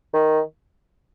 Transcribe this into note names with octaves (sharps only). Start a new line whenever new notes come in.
D#3